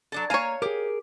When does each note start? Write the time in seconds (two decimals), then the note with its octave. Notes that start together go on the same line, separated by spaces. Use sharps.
0.12 F#3 D4 A4
0.30 A#3 C#5 F5 G#5 A#5
0.62 G4 G#4 A#4